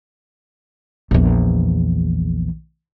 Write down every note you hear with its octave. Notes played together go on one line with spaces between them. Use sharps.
A#1 E2